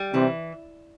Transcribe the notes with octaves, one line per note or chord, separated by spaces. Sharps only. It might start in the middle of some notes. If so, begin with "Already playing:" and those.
Already playing: G3
C3 E3